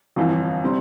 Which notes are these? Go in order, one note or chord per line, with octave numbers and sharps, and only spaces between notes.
G1 F2 E3
C3 G3 C4